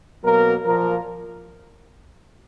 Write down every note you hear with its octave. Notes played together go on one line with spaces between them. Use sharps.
B2 F#3 A#3 A#4
A#2 F3 A#3 A#4